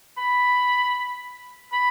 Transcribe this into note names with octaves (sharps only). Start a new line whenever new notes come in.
B5
B5